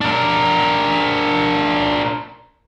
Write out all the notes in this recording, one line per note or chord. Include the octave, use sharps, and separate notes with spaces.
D4 A#4